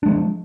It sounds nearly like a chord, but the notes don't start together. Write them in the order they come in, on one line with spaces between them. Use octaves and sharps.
D4 G#3 F3